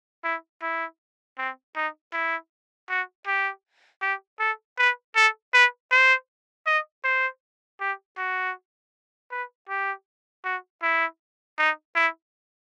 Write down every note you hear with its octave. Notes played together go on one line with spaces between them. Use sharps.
E4
E4
C4
D#4
E4
F#4
G4
G4
A4
B4
A4
B4
C5
D#5
C5
G4
F#4
B4
G4
F#4
E4
D#4
E4